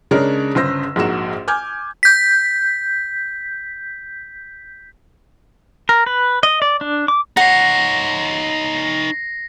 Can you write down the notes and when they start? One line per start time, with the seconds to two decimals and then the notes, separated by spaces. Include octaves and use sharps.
0.11 C#3 G#3 D4 A#4 C#5
0.55 G1 C#3 C5 E6 A#6
0.96 A#1 G#2 A#3 F#4 E7
1.48 G#5 D6 F6 G6 G#6
2.03 G6 B6
5.89 A#4
6.06 B4
6.43 D#5
6.62 D5
6.81 D4
7.08 D6
7.37 D#4 C#5 F#5 A#6 C7